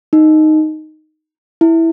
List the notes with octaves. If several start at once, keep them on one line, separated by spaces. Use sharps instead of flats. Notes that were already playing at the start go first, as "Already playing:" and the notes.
D#4
E4